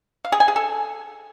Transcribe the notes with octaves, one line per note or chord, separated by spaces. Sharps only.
F5
G#4
G#5
G#4
A4